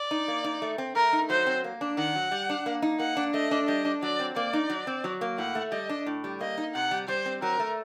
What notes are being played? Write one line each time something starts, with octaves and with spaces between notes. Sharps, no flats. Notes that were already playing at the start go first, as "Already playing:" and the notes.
Already playing: D5
D#4
A#3
D#4
A3
C4
A3 A#4
D#4
F#3 C5
C4
A#3
D4
D#3 F#5
F#3
G3
D4
A#3
D#4
A#3 F#5
D4
A3 D#5
D4
G3 D#5
D4
F#3 D5
C4
A#3 D5
D#4
F#3
C4
F#3
A#3
A2 F#5
A3
G3 D#5
D4
A2
G3
A#3 D#5
D#4
C3 F#5
G3
G3 C5
C4
F#3 A#4
A3